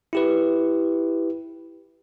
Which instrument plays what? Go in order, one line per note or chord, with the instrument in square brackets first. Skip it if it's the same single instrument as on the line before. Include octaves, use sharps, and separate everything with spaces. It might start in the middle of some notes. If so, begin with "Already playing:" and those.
[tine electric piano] E4 G4 B4